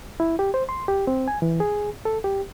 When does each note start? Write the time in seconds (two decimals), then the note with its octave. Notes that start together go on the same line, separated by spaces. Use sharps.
0.20 E4
0.39 G4
0.54 C5
0.69 C6
0.88 G4
1.07 C4
1.28 G#5
1.42 E3
1.60 G#4
2.05 A4
2.24 G4